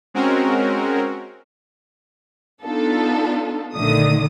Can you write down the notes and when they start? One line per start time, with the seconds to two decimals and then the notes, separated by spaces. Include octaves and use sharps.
0.14 G#3 C4 C#4 F#4 A#4
2.63 B3 D4 D#4 F4 A4
3.75 A#1 D3 D#3 A3 D#6